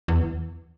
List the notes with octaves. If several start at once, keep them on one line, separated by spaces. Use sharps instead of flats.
E2